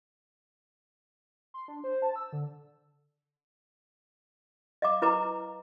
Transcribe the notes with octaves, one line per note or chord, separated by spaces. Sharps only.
C6
D4
C5
A5
E6
D3
D#5 F5 D6
E4 B4 A#5 D6